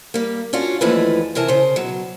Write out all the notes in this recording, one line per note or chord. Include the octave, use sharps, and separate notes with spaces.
G3 A#3
C#4 D4 F4 F#4
D#2 E3 F3 A3 G#4 B4
C3 E3 A#4 G#5 A5
C#3 C5
B2 F#3